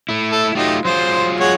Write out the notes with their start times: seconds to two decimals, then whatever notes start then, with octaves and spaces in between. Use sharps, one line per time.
0.09 A3 E4
0.32 A4
0.55 F#3 A3 D#4 F4 G4
0.85 F#3 F4 G#4 C5 C6
1.40 G#3 C#5 F#5